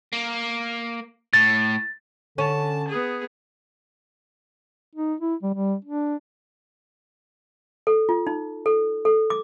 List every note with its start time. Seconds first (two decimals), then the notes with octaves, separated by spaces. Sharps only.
0.13 A#3
1.33 A2 A6
2.38 D3 C#4 A5
2.88 B3 G#4
4.95 D#4
5.20 E4
5.43 G3
5.54 G3
5.85 D4
7.87 A4
8.09 F4
8.27 D#4
8.66 A4
9.05 A4
9.30 D6